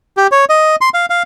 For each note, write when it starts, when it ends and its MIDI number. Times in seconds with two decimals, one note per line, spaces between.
0.17 0.27 67
0.31 0.45 73
0.49 0.76 75
0.81 0.89 84
0.94 1.06 77
1.10 1.23 77